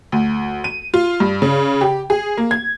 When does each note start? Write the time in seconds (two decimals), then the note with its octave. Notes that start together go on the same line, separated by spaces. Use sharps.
0.12 D2
0.64 D#7
0.94 F4
1.20 G2
1.42 C#3
1.81 G4
2.10 G#4
2.38 A#3
2.51 G#6